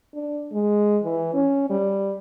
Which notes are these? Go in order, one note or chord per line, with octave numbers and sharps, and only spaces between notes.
D4
G#3
E3
C#4
G3